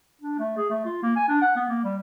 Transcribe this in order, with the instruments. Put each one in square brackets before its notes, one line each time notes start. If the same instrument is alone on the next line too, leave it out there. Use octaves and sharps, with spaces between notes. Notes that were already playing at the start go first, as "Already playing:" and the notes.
[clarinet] D4
A3
G#4
A3
F4
A#3
G#5
D4
F#5
B3
A#3
G3